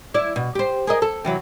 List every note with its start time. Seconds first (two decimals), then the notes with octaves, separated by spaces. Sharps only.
0.14 E4 D5
0.36 B2
0.55 G4 C5
0.87 G#4 A#4 D#5
1.02 A4
1.25 C3 E3 F#3